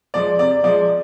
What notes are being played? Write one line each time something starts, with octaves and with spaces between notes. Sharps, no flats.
F3 G#3 D5
C3 D5
F3 G#3 D5